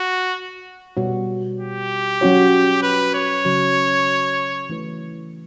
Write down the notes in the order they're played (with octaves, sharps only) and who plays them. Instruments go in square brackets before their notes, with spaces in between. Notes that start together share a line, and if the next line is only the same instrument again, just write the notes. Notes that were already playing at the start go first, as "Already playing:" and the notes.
Already playing: [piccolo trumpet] F#4
[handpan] B2 G3 B3 F#4 C#5
[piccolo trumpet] G4
[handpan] F#3 C#4 F#4 C#5
[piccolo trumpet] B4
C#5
[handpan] C#3 F#3 C#4 F#4
E3 A3 E4 B4